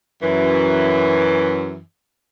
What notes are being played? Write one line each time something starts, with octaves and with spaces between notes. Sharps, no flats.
F#2 E3